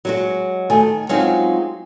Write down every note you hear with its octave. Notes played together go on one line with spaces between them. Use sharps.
F#3 G#3 F#4
D#3 A3 G#5
F#3 G#3 C4 C#4 D#4 F4